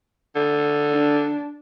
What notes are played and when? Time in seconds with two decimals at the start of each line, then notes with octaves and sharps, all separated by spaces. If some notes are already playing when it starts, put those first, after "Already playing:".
0.35 D3
0.91 D4